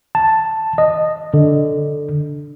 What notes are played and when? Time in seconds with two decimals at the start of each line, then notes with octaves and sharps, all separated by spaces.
0.15 A5
0.78 D#5
1.34 D3